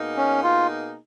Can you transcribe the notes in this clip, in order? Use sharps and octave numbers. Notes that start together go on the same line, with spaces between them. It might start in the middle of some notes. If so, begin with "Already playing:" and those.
Already playing: B2 A#3 D#4 G#4
C#4
F4